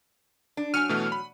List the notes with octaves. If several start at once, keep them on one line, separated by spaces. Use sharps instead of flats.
D4
F#3 G#5 F6 C#7 D#7
B2 E3 A3
B5